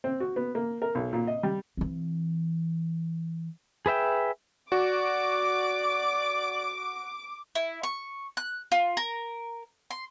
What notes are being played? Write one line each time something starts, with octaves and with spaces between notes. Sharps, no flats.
C4
F#4
B3
A#3
A#4
B1
A#2
D#5
G3
E3 C4
G#4 B4 E5 G5
F#4 D5 D6
E4
C#6
F#6
F4
A#4
C6